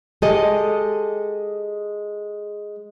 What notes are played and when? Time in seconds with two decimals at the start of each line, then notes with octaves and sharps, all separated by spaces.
0.22 G#3 G4 A4 D#5